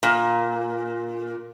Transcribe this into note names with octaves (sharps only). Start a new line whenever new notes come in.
A#2